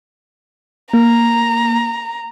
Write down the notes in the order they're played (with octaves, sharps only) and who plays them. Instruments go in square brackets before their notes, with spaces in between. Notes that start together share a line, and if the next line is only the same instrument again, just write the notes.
[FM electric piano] A#3 [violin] A#5